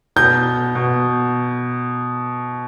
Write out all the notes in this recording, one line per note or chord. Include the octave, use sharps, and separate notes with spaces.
B2 G6
B2